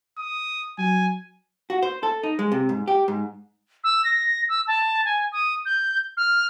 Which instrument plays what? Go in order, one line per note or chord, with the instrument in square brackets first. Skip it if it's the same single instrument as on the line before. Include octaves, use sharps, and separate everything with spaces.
[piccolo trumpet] D#6
[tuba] F#3 [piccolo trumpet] G#5
[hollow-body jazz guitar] F#4
C5
A4
D#4
G#3
C3
G#2
G4
G#2
[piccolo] E6
A#6
E6
A5
G#5
D#6
G6
F6